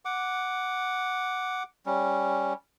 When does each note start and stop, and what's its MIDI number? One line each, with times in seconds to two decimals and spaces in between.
0.05 1.63 78
0.05 1.63 86
1.86 2.53 55
1.86 2.53 61